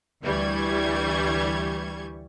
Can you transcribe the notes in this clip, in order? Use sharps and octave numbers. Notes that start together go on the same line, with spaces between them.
D2 E3 G3 C#6 G#6